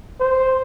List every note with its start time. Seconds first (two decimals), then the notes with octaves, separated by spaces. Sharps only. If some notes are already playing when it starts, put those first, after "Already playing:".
0.20 C5